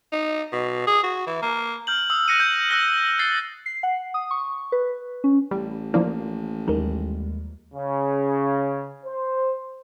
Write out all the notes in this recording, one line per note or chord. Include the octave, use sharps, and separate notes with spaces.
D#4
B2
G#4
F#4
E3
A#3
F6 G6 F#7
D#6 E6
F#6 A#6 C#7 D#7
G6
E6 F#6 A#6 G7
A6 C7 G7
C7
F#5
D#6
C#6
B4
C#4
A1 G3
F3 A#3 D4 E4 D5
D#2 G3 G#3 D#4 A#4
C#3
C5